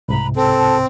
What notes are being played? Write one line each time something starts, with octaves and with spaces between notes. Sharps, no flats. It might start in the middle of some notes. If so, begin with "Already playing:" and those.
C2 G#2 C3 A#5 B5
C4 A4 A5